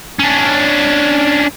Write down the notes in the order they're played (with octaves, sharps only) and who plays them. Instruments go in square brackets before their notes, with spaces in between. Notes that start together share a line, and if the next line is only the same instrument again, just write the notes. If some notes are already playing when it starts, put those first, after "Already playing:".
[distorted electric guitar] C#4 D4